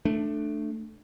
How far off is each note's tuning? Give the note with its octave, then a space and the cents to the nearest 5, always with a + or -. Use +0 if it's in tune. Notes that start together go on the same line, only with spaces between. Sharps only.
A3 +0 D4 +15